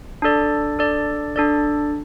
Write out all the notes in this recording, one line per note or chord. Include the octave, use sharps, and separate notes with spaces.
D4 A4 D5
D4 A4 D5
D4 A4 D5